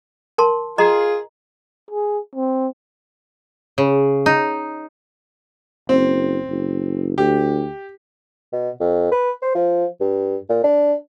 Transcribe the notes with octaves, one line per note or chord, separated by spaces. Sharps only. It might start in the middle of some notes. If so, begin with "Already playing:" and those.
A#4 A5 C6
F4 G#4 D#5 A#5
G#4
C4
C#3
D#4
F#1 C4
F#1
D2 G4
B2
F2
B4
C5
F3
G2
A#2
D4